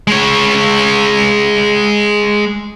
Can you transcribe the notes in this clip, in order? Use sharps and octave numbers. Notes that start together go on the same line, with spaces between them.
G#3 C#5